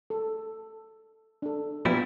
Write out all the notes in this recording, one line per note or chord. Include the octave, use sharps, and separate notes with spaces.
A4
D4 A4
A#2 F3 G3 B3 E4 B4